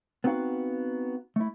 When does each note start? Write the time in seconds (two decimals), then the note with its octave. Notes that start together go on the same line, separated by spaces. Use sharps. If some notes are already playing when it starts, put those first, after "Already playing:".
0.24 B3 C4 D#4 F#4 F5
1.36 A3 E4